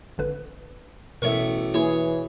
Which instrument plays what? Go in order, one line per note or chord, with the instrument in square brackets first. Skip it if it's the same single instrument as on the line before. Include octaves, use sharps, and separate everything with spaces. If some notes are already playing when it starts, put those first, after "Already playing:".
[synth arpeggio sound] G#1 D3 B4
[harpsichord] A1 C#6 [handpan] B2 E5 [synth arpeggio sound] A#4 C#5
[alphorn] E3 [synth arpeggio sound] A#3 E4 [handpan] G#4 [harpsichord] C#5